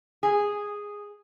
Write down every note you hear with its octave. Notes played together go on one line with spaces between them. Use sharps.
G#4